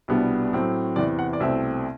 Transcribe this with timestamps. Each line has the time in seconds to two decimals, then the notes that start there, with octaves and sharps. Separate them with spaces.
0.08 C2 B2 G3 B3 D4
0.53 A2 F#3 A3 C4
0.96 E2 C3 E3 D5
1.19 F#5
1.33 D5
1.40 C2 B2 A3 C4 E5